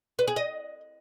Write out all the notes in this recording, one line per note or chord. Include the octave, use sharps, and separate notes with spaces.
B4
G#4
D#5